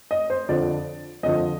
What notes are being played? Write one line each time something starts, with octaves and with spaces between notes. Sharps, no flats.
D#5
C5
F2 D3 F3 D5
F2 D3 F3 D#5